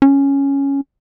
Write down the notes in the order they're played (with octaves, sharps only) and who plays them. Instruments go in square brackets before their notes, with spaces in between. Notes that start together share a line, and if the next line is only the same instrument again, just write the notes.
[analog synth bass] C#4